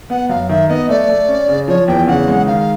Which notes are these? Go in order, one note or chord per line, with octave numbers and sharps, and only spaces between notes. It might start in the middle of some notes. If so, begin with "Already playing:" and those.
B3 F#5
F#2 F5
D#3 E5
B3 D#5
A3 D5
A3
C#4
C#3
F3 C#5
E2 G5
C#3 F#5
G#3
D#3 F5